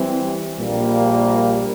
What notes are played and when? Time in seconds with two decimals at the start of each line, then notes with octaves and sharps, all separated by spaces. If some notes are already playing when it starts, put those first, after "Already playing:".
Already playing: E3 G3 C4
0.59 A#1 A#2 G3 A#3